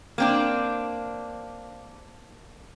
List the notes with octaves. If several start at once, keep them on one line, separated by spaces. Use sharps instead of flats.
A#3 C4 D4